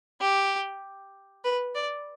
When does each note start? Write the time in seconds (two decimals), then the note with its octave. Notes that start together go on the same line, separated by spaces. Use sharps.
0.21 G4
1.45 B4
1.75 D5